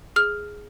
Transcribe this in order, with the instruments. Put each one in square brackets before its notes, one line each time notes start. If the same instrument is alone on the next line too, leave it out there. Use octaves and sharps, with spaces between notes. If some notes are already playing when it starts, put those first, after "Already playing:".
[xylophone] G#4 F6